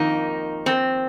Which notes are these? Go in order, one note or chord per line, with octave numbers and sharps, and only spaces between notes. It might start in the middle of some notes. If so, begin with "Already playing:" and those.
Already playing: F2 D#3 A#3 D#4
C4